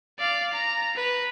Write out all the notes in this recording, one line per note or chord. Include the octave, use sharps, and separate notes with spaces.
D5 F5
A#5
B4